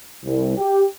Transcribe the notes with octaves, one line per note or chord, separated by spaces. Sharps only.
C2
G4